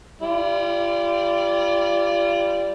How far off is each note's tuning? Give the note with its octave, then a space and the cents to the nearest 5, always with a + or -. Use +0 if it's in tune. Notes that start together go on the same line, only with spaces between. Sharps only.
G3 +0 F4 -35 D5 -10